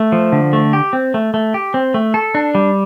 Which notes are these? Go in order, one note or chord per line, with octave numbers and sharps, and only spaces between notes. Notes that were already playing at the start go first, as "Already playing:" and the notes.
Already playing: A3
F3
D3
A3
G4
C4
A3
A3
G4
C4
A3
A4
D4
G3